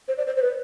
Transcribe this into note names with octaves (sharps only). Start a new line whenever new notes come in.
C5
D5
C5
C5
B4